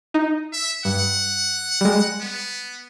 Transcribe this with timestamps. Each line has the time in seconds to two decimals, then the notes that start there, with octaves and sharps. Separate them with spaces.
0.14 D#4
0.53 E5
0.85 G2 F#5
1.81 G3 G#3
2.20 B3